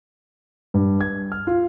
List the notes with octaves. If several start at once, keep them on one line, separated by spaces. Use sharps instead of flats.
G2
G#6
F6
F4